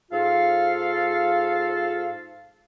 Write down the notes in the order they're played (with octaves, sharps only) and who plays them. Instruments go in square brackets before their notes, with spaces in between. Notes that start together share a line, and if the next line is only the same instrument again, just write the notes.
[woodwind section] G#2 F4 A4 F5